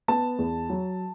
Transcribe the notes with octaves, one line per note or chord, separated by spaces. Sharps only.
B3 A5
E2
F#3